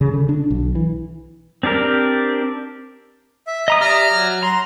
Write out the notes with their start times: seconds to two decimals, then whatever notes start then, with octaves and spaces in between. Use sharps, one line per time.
0.01 C#3
0.13 D3
0.29 D4
0.50 B1
0.75 E3
1.63 C4 D4 G4 A#4
3.47 E5
3.68 D#5 A#5 D#6
3.81 G4 D5 E5 A#5 F6
4.11 F#3
4.43 A#5 C6